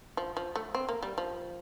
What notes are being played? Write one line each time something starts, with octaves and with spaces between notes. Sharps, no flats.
F3
F3
A3
C4
A#3
G3
F3